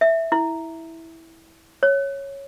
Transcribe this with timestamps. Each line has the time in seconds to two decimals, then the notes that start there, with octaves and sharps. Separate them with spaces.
0.01 E5
0.32 E4
1.83 C#5